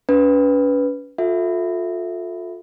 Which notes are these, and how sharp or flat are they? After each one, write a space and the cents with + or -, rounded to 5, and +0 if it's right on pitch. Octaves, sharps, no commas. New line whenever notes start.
C#4 +40 B4 +0
F4 +35 A4 +0 E5 +0